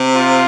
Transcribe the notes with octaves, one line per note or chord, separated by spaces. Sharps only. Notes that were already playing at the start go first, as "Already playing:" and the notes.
Already playing: C3
F4